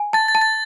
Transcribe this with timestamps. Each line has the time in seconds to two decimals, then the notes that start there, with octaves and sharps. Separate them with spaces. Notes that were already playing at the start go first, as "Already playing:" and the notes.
Already playing: G#5
0.13 A5 A6
0.28 A6
0.35 A5
0.41 A6